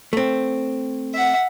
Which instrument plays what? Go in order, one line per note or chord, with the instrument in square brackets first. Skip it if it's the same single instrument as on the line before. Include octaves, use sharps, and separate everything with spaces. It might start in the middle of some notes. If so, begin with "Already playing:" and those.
[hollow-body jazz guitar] A3 C4
[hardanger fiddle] E5 F#5